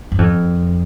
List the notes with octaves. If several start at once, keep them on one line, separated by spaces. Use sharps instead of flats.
F#2
F2